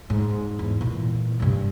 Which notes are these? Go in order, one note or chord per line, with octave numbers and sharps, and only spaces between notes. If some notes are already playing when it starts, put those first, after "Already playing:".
G#2
E2
A#2 E3
G2 C3